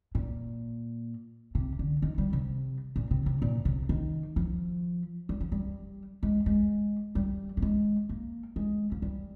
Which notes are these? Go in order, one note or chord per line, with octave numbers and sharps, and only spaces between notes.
A#2
C3
D3
D#3
G3
C3
A#2
C3
C3
A#2
C3
D#3
F3
G3
F3
G3
G#3
G#3
G3
A#3
G#3
A#3
G#3
F3
G3